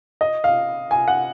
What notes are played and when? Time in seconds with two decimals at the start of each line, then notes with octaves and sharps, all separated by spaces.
0.21 D#5
0.44 F5
0.91 G#5
1.08 F#5